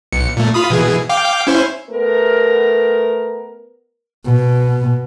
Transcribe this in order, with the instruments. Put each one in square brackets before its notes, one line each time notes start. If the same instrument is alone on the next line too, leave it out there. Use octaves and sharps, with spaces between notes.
[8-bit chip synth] B1 C#7
A#2 A3
F4 B5 D#6
B2 E3 G#4
F5 G5 D6
C#4 E4 C5
[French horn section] A3 B3 A#4
[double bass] B2